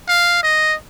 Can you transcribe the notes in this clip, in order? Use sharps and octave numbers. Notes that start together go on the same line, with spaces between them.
F5
D#5